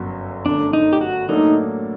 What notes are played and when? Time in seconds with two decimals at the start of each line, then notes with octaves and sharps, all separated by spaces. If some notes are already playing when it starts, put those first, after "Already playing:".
Already playing: G1 F#2 F#3
0.46 G1 F#2 D3 A3 D4
0.73 D#4
0.93 G4
1.01 F#4
1.29 A2 F#3 A#3 D4 D#4 A4